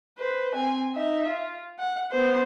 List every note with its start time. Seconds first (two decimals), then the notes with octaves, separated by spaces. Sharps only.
0.18 B4 C5
0.55 C4 G#5
0.95 D#4 E5
1.27 F4
1.79 F#5
2.11 B3 C5